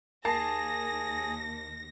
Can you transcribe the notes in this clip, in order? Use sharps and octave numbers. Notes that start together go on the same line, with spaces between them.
D#2 A#3 G#4 A5 A#6 C7